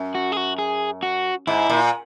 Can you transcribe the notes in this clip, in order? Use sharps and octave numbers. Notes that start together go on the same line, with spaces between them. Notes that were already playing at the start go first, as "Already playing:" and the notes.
Already playing: F#2
F#4
G#4
F#4
G#4
F#4
G#2 E4
A#2